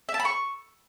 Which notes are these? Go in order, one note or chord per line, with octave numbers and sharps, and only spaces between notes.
E5
A5
B5
C#6